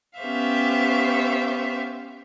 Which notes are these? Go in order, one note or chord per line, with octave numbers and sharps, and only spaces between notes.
B3 C#4 G4 C5 E5 F5